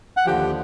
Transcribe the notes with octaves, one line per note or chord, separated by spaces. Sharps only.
F#5
D#2 D3 F3 G4 G5